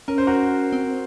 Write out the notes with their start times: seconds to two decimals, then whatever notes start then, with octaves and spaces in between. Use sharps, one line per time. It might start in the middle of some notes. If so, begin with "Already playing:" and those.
0.08 C#4 A#4
0.18 C5
0.27 F#4 A#4
0.73 C4